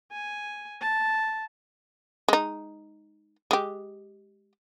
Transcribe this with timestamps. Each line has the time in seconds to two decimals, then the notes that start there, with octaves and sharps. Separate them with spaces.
0.12 G#5
0.81 A5
2.28 G#3 D#4
3.51 G#3 G4